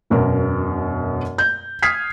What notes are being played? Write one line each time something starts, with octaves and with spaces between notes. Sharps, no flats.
E1 F#2 B2 A#4
G6
D#6 F6 G#6 B6 C7